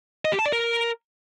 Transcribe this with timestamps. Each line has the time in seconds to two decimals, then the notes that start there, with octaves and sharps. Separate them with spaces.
0.25 D#5
0.32 G4
0.39 A5
0.46 D5
0.52 A#4